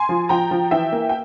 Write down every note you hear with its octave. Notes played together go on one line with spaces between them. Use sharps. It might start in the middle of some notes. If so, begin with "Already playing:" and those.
Already playing: G#5 C6
F3
F3 G5 A#5
F3
E3 E5 G5
A#3
G5